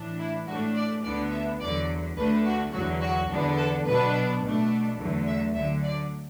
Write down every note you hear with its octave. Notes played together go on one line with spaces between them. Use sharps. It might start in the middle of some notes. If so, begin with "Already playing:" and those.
Already playing: A2 E3 D4
E4
A2 A3 D4 F#4
D5
D2 D3 B3 D4 D5
E5
E2 D3 F#3 D5
D2 D3 A3 D4 B4
F#4
E2 D3 F#3 F#4
F#4
E2 D3 B3 D4
A4
B2 F#3 B3 D4 B4
B2 A3 D4
E2 D3 F#3 A3
E5
D2 D3 F#3 E5
D5